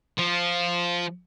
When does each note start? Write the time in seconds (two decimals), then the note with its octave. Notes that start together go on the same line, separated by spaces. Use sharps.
0.18 F3